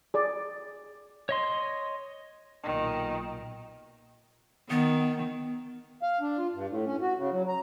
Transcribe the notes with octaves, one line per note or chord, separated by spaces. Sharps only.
G#4 D5
C#5 D#5 C6
B1 A#2 D#3
D#3 B3
F5
D4
F4
G2
A2
C#4
F#4
C#3
F#3
A#5